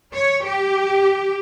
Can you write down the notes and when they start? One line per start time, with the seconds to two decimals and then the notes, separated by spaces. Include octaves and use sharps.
0.16 C#5
0.46 G4